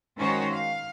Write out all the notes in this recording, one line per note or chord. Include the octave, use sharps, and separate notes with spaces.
D#3 G#3 C#4 F#4 C5 C#5
F5